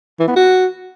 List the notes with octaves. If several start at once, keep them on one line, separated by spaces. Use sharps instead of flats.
E3
B3
F#4